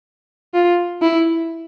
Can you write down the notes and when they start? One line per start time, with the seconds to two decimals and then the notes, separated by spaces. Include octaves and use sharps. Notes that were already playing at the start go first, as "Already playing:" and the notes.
0.54 F4
1.02 E4